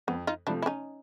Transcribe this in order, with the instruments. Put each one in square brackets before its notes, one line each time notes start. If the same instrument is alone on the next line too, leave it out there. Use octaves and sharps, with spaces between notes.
[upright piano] F2 [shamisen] B3
[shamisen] D#4 F4
[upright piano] C3 F3 A3 [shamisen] D4 E4
[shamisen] E4
C#4 D#4